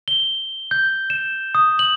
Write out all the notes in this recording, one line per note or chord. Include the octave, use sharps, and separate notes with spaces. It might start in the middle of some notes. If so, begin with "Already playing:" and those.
G7
G6
E7
D#6
F#7